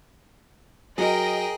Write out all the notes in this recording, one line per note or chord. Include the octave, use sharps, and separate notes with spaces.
F#3 G#4 A#4 D#5 G5